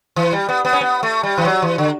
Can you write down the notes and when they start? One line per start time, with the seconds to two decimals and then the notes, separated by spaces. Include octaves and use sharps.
0.16 E3
0.32 G3
0.49 B3
0.65 B3
0.73 C#4
0.81 B3
1.03 A3
1.23 G3
1.38 E3
1.45 F#3
1.62 E3
1.78 D3